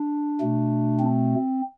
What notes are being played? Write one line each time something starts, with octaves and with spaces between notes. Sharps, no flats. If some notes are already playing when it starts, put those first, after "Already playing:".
Already playing: D4
B2 A3
C4